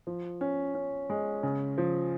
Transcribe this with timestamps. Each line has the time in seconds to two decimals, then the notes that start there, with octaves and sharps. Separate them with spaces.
0.07 F3
0.41 C#4
0.75 C#4
1.10 G#3
1.43 C#3
1.78 F3